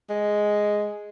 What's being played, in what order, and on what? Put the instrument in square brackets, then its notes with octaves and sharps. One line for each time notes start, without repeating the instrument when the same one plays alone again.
[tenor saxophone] G#3